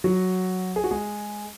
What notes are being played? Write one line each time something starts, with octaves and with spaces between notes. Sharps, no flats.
F#3 F#4
G#4
F#4
G#3 G#4